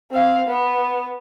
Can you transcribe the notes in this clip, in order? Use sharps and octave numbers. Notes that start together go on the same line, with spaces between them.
C4 F5
B3